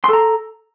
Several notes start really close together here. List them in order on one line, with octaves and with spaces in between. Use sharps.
C6 A4 A#5